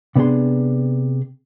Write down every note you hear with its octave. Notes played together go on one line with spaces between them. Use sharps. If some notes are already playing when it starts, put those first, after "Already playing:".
C3 B3 D4 G#4 C6